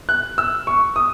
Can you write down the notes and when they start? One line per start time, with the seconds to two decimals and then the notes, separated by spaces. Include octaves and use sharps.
0.09 F#6
0.38 E6
0.67 C#6
0.96 D#6